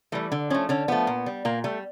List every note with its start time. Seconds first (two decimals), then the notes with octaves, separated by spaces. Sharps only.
0.12 E3 G3 A3
0.32 D3
0.50 F3 A3 C#4
0.69 D3 C#4
0.88 F3 A3 B3
1.07 A#2
1.26 G3
1.45 A#2 A#3
1.64 G3 A3